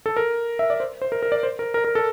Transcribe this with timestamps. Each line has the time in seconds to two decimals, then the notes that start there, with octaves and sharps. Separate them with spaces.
0.06 A4
0.17 A#4
0.59 E5
0.70 D5
0.80 C5
1.02 C5
1.12 A#4
1.22 A#4
1.32 D5
1.43 C5
1.59 A#4
1.74 A#4
1.84 A#4
1.95 A4